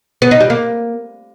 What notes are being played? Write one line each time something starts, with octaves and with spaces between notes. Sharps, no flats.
B3
D#4
G3
A#3